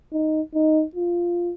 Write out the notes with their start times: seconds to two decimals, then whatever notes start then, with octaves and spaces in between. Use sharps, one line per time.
0.13 D#4
0.54 D#4
0.96 F4